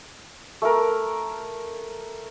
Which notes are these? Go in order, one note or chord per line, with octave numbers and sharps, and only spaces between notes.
A3 A#4